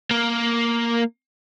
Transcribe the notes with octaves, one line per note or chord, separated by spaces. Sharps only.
A#3